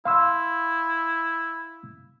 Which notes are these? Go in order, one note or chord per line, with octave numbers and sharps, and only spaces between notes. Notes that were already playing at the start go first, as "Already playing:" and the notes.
E4 F5 C6 E6